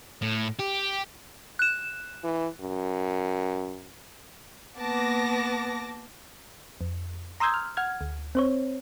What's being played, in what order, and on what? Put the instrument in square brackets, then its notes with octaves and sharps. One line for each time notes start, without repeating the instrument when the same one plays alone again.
[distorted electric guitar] A2
G4
[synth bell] F#6 E7
[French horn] E3
F#2
[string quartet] A#3 B3 [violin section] A5 D6 A#6
[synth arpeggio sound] F2
A#5 C6 D#6 E6 G6 G#6
F6
F#5 F6 G#6
D2
C4 C5 C#5